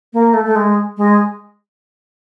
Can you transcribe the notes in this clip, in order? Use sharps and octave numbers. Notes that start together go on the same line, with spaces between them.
A#3
A3
A3
G#3
G#3